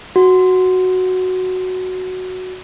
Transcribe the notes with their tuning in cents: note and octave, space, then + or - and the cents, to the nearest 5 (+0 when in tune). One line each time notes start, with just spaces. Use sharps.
F#4 +0